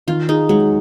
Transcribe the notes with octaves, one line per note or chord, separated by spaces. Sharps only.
D#3 F4
D#4 G#4
F#3 G#3